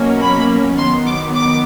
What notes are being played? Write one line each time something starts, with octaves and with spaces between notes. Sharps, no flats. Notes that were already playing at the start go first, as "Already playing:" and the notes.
Already playing: B2 F#3 A#3 C#4
B5
D#3 F#3 B3 C6
D6
D6